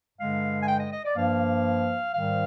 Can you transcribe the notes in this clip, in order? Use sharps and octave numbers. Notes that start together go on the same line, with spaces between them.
G2 D3 G#3 F5
G#5
G5
D#5
D#5
D5
G2 F3 A#3 F5
G#2 D#3 G3 F5